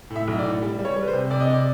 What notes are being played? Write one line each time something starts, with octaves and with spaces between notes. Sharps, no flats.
A2
E5
B1
D5
A2
G3
G3
C#5
G3
B4
C5
C3
C3 D5
D#5
C3 D5